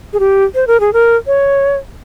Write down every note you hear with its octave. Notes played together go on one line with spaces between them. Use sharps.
G#4
G4
C5
A#4
G#4
A#4
C#5